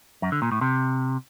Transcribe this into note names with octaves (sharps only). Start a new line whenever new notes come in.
F#2
D3
A#2
A2
C3